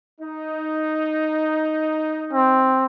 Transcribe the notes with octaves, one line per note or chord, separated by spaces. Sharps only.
D#4
C4